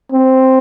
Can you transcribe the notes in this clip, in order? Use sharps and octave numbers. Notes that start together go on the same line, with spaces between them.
C4